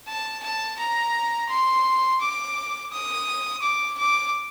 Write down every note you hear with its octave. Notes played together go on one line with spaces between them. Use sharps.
A5
A5
A#5
C6
D6
D#6
D6
D6